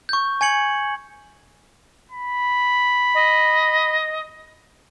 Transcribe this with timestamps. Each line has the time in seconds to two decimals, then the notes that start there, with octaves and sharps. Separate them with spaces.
0.09 C#6 G6
0.41 G#5 G#6 C#7 F#7
2.11 B5
3.14 D#5